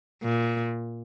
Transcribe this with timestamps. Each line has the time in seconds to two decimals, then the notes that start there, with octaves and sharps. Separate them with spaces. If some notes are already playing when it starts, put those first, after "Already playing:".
0.23 A#2